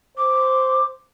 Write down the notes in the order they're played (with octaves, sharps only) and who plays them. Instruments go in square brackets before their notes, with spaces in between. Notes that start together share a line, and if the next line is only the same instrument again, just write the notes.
[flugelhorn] C5 [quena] D6